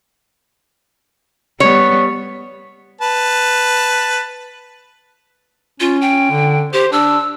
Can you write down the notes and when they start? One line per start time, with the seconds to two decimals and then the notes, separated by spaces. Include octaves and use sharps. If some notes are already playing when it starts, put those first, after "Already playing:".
1.60 G3 B3 C#5
3.01 B4 A5
5.80 C#4 F4
6.01 G5
6.31 D3
6.73 G4 C5
6.92 D4 E6